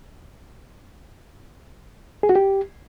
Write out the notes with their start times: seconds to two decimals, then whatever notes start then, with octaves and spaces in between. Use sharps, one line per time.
2.23 G#4
2.29 F#4
2.36 G4